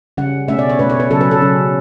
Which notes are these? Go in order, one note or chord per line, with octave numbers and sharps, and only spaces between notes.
C#3 G3 C#4 F#5
B2 A3 C#4 E5
D5
C#5
B2 A3 C#4 B4
C#5
B4
C#3 F#3 C#4 A4
B4
A4
C#3 F#3 C#4